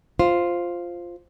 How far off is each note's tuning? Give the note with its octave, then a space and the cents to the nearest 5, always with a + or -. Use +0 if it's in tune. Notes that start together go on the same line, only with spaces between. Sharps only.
F4 +0 C5 +0